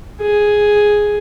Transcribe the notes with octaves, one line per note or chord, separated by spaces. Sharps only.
G#4